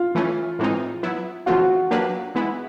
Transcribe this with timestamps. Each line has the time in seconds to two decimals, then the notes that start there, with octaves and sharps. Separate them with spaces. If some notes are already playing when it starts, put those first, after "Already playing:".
Already playing: F4
0.15 E3 A3 C#4
0.59 A2 E3 G#3 C4 D#4
1.03 F#3 B3 E4
1.46 C#3 E3 A3 C4 F4 F#4
1.91 F#3 A#3 D4 G4 B4
2.35 E3 G#3 B3 E4